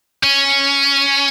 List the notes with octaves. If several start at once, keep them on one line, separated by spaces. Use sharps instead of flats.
C#4